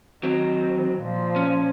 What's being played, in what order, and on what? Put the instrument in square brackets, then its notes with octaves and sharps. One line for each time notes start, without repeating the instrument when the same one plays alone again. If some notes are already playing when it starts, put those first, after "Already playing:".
[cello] D#3 [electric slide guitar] F#3 C4
[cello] A#2 F3
[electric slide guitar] C#4